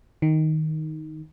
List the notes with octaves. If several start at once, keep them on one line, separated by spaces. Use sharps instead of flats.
D#3